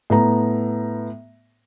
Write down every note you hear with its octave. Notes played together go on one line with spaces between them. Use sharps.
A2 B3 A#5